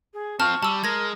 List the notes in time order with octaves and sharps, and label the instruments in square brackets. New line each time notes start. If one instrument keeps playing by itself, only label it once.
[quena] G#4
[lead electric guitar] C4 F4 [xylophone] A5 F6 [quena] C#6
[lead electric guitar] G3 [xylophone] A5 E6
[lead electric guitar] G#3 [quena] A#4 [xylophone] G#6 A#6